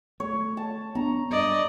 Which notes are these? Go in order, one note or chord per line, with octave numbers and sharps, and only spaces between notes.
A3 C#5
A5
B3 D4 A#5
G2 D5 D#5